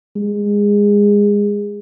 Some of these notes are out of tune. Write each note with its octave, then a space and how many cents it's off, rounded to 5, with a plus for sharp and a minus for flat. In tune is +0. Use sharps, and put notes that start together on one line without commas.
G#3 -20